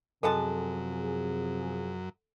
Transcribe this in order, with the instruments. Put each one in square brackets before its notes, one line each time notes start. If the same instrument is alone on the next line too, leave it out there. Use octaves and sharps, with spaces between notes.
[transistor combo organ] F#2 [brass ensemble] C3 F3 G#4 [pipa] G#3 F#5 A5 [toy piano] A4